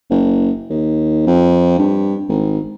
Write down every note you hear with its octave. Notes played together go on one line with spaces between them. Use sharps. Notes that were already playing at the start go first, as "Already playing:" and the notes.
F#1
D#2
F2
G2
G#1